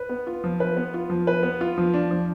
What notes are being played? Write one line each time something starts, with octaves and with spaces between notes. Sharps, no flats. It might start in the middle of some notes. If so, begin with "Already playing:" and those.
Already playing: B4
B3
F4
F3
B4
B3
F4
F3
B4
B3
F4
F3
D4
F3